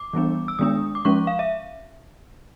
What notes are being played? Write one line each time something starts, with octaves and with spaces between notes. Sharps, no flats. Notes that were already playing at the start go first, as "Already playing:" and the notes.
Already playing: D6
E3 G3 B3 D4
E6
D#3 G#3 B3 D4 D#6
D6
F3 G#3 C#4 C#6
F5
E5